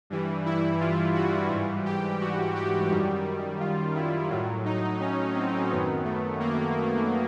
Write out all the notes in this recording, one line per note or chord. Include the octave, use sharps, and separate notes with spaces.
G2 E3 G3
E4
F4
F#4
G#2 E3 G3
G4
F#4
G4
F#2 D#3 G3
F4
E4
A2 F#3
D#4
C#4
C4
F#2 D#3 F#3 B3
A3
A#3